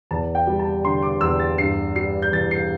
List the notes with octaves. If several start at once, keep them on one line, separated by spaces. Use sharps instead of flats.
E2 A5
G5
G3
A5
D3 C6
D6
E2 E6
A6
G2 C7
G3 C7
G6
E3 A6
C7